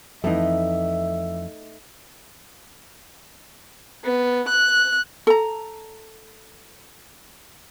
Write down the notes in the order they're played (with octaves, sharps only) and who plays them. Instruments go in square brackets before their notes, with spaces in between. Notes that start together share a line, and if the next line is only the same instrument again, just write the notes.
[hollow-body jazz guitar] F2 E3 [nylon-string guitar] A3 D#4 [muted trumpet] E5
[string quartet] B3
F#6
[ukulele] A4 A#5